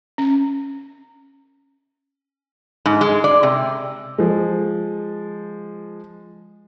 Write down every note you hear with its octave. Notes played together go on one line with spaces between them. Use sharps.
C#4
G#2
G#3
D5
C3
F3 G#3